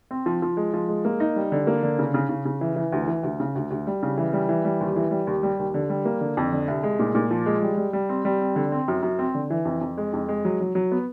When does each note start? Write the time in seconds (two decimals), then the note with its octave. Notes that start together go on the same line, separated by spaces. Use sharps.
0.11 C4
0.26 F3
0.42 F3
0.57 G#3
0.74 F3
0.89 G#3
1.05 A#3
1.20 D#4
1.36 G3
1.52 D3
1.67 A#3
1.83 D3
1.99 C#3
2.14 C#3
2.29 C#3
2.45 C#3
2.61 E3
2.76 E3
2.92 D2
3.08 E3
3.23 D2
3.40 C#3
3.56 D2
3.71 D2
3.87 G3
4.03 C#3
4.18 E3
4.33 G3
4.49 E3
4.65 G3
4.80 D#2
4.96 E3
5.11 G3
5.27 D#2
5.43 G3
5.59 D#2
5.74 D3
5.89 G3
6.05 A#3
6.21 D3
6.37 F2
6.52 D3
6.68 C2
6.83 G#3
6.99 A#2
7.15 A#2
7.31 F3
7.46 G#3
7.62 G3
7.77 G3
7.93 G3
8.09 C4
8.25 G3
8.41 C4
8.56 D3
8.72 C4
8.88 F#2
9.03 F#2
9.19 C4
9.34 D3
9.50 E3
9.65 F2
9.81 F2
9.98 G#3
10.13 F2
10.29 G#3
10.45 F#3
10.60 F#3
10.75 F#3
10.92 B3